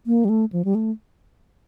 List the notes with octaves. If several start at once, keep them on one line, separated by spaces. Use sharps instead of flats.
A#3
G3
A3
F3
G3
A3